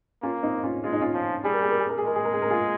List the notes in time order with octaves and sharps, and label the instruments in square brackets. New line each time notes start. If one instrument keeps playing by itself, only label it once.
[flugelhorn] A#3 [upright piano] C#4 F4
[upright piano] C4 D#4
C#4 F4
[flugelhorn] G#3 [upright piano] F4
[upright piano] D#4
C#4 F4
[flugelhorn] F3
[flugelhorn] G3 [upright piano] G#4
[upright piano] A#4
G#4
A#4
G#4
A#4
G#4
[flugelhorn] G#3 [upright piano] A#4
[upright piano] G#4
A#4
G#4
A#4
F4 G#4